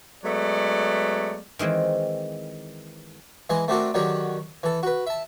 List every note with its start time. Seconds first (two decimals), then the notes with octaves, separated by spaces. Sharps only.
0.22 F#3 G#3 A3 B3 D5
1.59 D#3 E3 G#3 C4
3.50 E3 G#3 D#5 G#5
3.68 A3 C4 D4 F#4 A4 A#4
3.94 D3 D#3 F#3 F#4 G4 C#5
4.63 E3 A4
4.83 F#4 B4
5.07 E5 A5